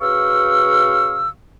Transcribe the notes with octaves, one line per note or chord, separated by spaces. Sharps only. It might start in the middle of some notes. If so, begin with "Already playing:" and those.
C#3 F#4 B4 F5 C#6 E6